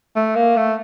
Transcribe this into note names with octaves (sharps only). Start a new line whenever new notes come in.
A3
A#3
A3